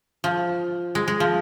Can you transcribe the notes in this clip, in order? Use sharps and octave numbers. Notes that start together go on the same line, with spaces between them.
F3
G#3
G#3
F3